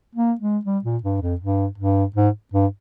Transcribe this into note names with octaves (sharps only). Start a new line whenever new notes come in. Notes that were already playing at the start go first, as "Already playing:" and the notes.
A#3
G#3
G3
A#2
G2
F2
G2
G2
G#2
G2